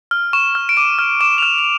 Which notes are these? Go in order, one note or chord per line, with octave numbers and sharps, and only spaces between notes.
F6
C#6 E7
F6
D7
D6 D#7
F6
D6 E7
F7
F6 E7
F7